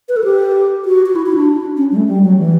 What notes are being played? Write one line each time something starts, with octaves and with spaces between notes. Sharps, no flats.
B4
A4
G4
F#4
F#4
E4
E4
D4
C#4
G3
A3
G3
F#3
E3